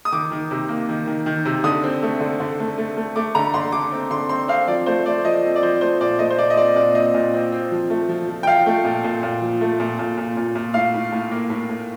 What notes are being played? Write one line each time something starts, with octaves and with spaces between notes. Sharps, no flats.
D#6
D#3 D6
D#3
C3
A#3
D#3
D#3
D#3
C3
D3 D#6
C4
A3
D3
D3
A3
A3
A3
A3 D6
D3 A#5
D3 C6
D3 D6
C4
D3 C6
C4 C6
C4 F5
F3 D5
A3 C5
A3 D5
F3 D#5
C4
D5
F3 C5
A3 C5
A#2 D5
A3 D#5
C5
A#2 D5
D#5
C4 D5
A#2 D5
C4 D#5
A#2
C4
C4
F3
A3
F3
F3
G5
F3 F5
A3
A#2
A#2
A#2
F3
A3
A#2
A#2
A#2
A#2
A#2
A2 F5
A2
A2
A#3
A2
A2